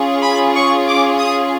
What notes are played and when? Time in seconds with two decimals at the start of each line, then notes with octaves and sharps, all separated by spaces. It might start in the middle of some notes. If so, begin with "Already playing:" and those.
Already playing: C#4 F4 G#4
0.22 B5
0.55 C#6
0.87 D6
1.19 D#6